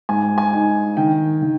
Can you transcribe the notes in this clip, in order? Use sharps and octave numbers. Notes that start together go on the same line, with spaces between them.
G#2 G#5
G#5
D#4
D#3 G5
D#3